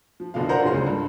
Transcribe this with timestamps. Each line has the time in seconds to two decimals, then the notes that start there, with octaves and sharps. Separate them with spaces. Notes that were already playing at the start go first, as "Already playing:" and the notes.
0.20 F3
0.34 F#1 B2 D3 F3 F5
0.49 A#4 C5 D5 F#5 A#5
0.62 F#1 C#4 F4 G#4 C6
0.74 C#2 D3
0.87 G2